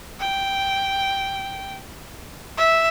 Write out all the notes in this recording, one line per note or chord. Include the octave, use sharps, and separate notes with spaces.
G5
E5